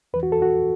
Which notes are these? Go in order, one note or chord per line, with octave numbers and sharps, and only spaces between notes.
E2 E3 B4
F#4
A4
F#4